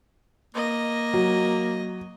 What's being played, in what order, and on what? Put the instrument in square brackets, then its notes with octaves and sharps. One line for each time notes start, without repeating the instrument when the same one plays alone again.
[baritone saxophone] A#3 [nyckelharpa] D#5
[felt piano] F#3